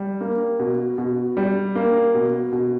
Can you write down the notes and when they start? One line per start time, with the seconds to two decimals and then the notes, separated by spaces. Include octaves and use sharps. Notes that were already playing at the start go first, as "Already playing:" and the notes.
Already playing: G3
0.21 A#3
0.59 B2
0.98 B2
1.37 G3
1.75 A#3
2.14 B2
2.52 B2